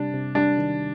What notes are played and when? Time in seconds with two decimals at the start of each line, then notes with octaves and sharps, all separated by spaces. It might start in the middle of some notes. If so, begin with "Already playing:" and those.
Already playing: C3 G3 D4
0.13 C3
0.35 G3 D4
0.58 D#3